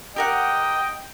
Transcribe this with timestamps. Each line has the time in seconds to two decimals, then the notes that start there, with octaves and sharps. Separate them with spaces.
0.16 G4 A#4 D#5 F#5 G5